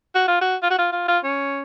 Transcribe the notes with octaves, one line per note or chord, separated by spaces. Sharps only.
F#4
F4
F#4
F4
F#4
F4
F4
F4
C#4